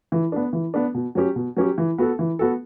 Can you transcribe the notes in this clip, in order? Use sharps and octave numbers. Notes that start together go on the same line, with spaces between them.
E3
B3 D4
E3
B3 D4
B2
F#3 C#4 G4
B2
F#3 C#4 G4
E3
B3 F#4 A4
E3
B3 F#4 A4